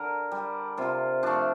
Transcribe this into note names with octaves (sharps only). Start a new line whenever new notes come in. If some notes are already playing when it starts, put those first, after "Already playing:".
Already playing: D3 A#4
G3
C3 F4
F3 A3 D4